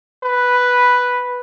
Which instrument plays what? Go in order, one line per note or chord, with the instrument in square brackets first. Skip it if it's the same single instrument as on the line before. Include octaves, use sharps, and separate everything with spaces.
[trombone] B4